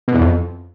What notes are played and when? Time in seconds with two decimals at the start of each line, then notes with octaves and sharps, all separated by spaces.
0.08 B2
0.14 E2
0.21 F2